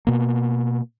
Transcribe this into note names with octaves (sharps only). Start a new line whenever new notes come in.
B2 A#3